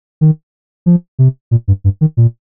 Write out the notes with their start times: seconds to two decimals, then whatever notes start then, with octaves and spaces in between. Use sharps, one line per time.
0.21 D#3
0.86 F3
1.19 C3
1.51 A#2
1.68 G2
1.84 G2
2.01 D#3
2.17 A#2